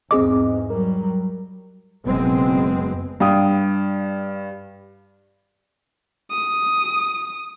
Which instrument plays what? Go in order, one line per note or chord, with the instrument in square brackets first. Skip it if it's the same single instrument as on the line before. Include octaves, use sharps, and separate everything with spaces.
[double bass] E2 G#2 [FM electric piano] C4 G#4 D#5 [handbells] D6
[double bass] F#3 G3 [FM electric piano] A#4
[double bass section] F#1 B2 G#3 B3 C4
[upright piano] G2 F5 G5 D#6
[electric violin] D#6